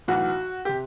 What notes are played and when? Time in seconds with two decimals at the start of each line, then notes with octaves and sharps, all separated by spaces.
0.08 B1 A2 E3 F#4
0.65 C3 G4